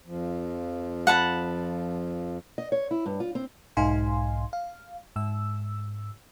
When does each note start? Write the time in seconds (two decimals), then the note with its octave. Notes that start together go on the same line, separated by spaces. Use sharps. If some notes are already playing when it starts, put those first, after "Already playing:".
0.07 F2 F3
1.07 F#5 A5 B5
2.58 D#5
2.72 C#5
2.91 E4
3.06 G2
3.20 F4
3.35 C4
3.77 B1 G#2 D#4 F5 G#5 C6
4.53 F5
5.16 G#2 E6